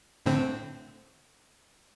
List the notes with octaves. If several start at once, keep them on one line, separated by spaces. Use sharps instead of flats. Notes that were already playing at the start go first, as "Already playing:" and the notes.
A2 D3 C4